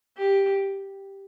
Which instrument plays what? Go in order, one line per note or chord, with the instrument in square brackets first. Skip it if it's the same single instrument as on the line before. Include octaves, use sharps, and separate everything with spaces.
[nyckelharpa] G4